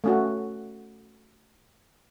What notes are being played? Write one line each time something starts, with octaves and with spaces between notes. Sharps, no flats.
A3 C#4 F#4